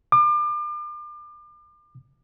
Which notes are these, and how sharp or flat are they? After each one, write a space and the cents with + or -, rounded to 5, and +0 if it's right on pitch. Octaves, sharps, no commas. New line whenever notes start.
D6 +35